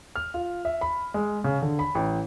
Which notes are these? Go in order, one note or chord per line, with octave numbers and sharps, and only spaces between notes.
F6
F4
E5
B5
G#3
C#3
D3
B5
A1